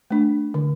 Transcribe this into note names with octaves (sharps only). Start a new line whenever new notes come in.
A3 D4
D3